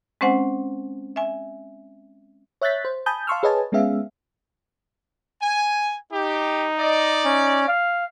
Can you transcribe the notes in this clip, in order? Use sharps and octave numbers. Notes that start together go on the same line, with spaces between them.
G#3 C4 C#4 C5 F#5 G#5
E5 G#5
C#5 E5 F#6 G6 A6 B6
C5
G#5 A5 B5 D#6 G6
F5 A5 C6 C#6 E6 F6
G#4 B4 C#5 D#5 G#5 A5
G#3 B3 C#4 G#4 E5 F5
G#5
D#4 G4
D5 D#5
C#4
F5